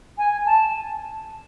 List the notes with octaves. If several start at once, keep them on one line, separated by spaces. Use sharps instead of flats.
G#5
A5